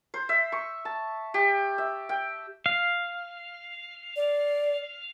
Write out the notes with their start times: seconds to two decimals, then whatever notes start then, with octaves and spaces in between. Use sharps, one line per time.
0.14 C5
0.29 E5
0.52 C#6
0.85 A5
1.34 G4
1.78 E5
2.09 G5
2.66 F5
4.16 D5